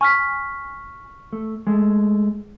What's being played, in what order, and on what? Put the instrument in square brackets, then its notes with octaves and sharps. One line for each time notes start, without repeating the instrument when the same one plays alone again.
[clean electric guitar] G#5 [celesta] C#6 F6 B6
[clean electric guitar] A3
G#3 A3